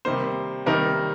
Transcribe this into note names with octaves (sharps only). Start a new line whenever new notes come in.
C3 D#3 G3 A#3 D#4 C5
C3 D#3 G3 A#3 D#4 A#4